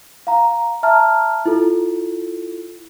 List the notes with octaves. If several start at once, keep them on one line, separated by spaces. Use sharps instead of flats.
F5 A#5
E5 A5 A#5 F6
E4 F4 A4